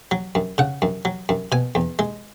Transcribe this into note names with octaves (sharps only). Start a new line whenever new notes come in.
F#3
F#2
C#3 F#5
F#2
F#3
F#2
B2 G#5
E2
G#3